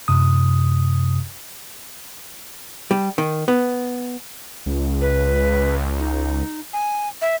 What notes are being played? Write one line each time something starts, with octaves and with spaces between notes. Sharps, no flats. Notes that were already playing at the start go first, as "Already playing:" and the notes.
F#2 C3 D#6
G3
D#3
B3
C#2
B4
D#4
G#5
E5